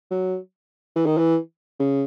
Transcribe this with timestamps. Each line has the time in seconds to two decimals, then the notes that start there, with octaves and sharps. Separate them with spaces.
0.11 F#3
0.96 E3
1.06 D#3
1.18 E3
1.80 C#3